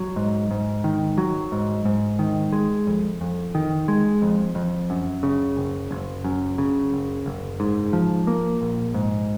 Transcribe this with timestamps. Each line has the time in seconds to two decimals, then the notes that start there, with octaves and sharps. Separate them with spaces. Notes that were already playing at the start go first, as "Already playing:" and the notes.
Already playing: F#3
0.16 G#2
0.51 G#2
0.84 D#3
1.18 F#3
1.52 G#2
1.85 G#2
2.19 D#3
2.52 G#3
2.87 F2
3.21 F2
3.55 D#3
3.88 G#3
4.22 F2
4.55 F2
4.90 F#2
5.23 C#3
5.57 F#1
5.91 F#1
6.24 F#2
6.58 C#3
6.92 F#1
7.26 F#1
7.60 G#2
7.93 F3
8.27 A#3
8.61 A#1
8.94 G#2